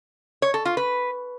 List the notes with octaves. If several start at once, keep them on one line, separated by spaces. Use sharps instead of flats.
C#5
A4
F4
B4